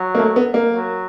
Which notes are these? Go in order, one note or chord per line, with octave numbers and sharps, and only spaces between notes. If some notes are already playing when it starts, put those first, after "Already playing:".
Already playing: F#3
A#3
A3
B3
A#3
F#3